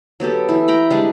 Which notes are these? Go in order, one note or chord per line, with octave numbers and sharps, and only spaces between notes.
F#3 B3 G4 A4
E3 E4
G5 A#5 B5
G3 G#3 D4